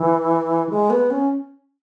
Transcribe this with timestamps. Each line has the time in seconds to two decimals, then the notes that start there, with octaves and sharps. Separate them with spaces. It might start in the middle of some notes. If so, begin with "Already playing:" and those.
Already playing: E3
0.70 G#3
0.90 B3
1.10 C#4